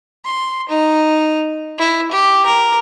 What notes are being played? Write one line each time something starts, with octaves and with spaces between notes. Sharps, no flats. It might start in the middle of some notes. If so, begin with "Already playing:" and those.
C6
D#4
E4
G4
A#4